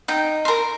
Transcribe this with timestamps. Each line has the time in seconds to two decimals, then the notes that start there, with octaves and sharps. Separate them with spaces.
0.08 D#4 G5
0.45 C6
0.48 A#4 A#5